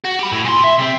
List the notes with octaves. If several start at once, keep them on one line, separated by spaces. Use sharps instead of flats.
F#4
G4 B5
A2
A#2 C6
E5
C3 C4